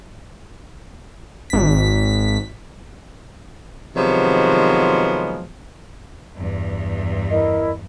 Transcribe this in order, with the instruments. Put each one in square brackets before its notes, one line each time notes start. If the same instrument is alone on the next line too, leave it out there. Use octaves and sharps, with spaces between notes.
[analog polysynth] G#1 B6
[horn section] C3 D#3 F3 F#3 G#3 B3
[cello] E2 G2
[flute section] E4 A#4 D#5